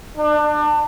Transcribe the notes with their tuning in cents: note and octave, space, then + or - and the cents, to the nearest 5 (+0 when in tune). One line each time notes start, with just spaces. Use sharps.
D4 +30